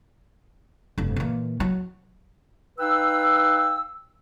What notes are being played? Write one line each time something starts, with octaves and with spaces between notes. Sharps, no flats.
F1 G2
A#2 E3
F#3
D#4 B4 F5 G5 E6